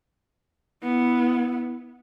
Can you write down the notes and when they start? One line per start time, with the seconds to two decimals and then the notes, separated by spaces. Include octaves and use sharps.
0.83 B3 E4